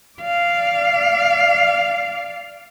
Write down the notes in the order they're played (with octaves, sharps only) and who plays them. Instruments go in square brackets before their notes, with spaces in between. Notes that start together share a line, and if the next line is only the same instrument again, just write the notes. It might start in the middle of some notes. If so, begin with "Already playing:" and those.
[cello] D5 F5